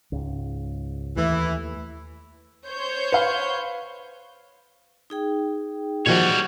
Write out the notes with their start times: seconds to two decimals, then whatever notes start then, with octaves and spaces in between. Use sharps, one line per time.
0.12 C#2 G#2
1.16 D#2 E3 A3 E4
2.67 C5 C#5 G6
3.12 B4 F5
5.10 D#4 G#4 G5
6.06 A#2 D#3 F3 G3 F#4 C#5